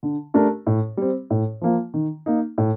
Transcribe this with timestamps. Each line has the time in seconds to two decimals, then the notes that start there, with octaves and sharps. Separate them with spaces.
0.03 D3
0.34 A3 D4 G4 A#4
0.67 A2
0.97 G3 C4
1.30 A2
1.61 F3 A#3 F4
1.94 D#3
2.26 A#3 D#4
2.58 A2